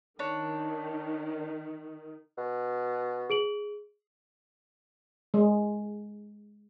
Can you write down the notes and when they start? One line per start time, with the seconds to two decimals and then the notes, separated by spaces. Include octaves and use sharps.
0.19 D#3 D4 C#5
2.38 B2
3.30 G#4 D7 F#7
5.34 G#3